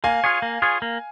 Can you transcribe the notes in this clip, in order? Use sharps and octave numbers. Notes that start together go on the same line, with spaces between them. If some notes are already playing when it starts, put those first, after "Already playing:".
A#3 F5 G#5
F4 G#4 C#5
A#3
F4 G#4 C#5
A#3